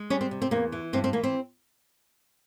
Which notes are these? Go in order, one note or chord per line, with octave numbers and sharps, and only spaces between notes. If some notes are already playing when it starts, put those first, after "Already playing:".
Already playing: G#3
G3 C#4
C4
C3
C4
E2 A#3
E3
G2 C4
C4
E3 A#3
C4